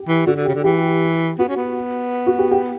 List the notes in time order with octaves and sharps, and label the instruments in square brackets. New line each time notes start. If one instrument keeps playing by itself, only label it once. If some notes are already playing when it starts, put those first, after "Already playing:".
Already playing: [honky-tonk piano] G4
[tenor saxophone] E3
[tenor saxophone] D3 [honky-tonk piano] F#4
[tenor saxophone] D3
[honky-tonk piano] G4
[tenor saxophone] C#3
D3
[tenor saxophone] E3 [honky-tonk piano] G4
[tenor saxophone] B3 [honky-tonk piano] F#4
[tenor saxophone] C#4
B3
[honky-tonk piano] F#4
G4
G4